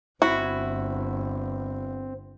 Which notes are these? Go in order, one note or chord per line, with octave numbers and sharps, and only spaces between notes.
G1 C4 E4 F#4